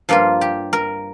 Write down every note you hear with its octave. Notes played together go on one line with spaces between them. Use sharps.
G2 F3 A#3 F4
G4
A#4